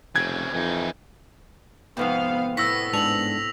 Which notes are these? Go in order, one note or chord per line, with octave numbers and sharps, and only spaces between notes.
F1 C#3 C4 G#6
F2 E3 D#4
F2 G#2 C3 B3 F5
A2 B3 F#4 D5 E6 A#6 B6
G#2 D4 A4 F7 F#7